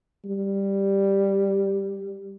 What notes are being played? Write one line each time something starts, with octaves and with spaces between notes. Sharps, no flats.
G3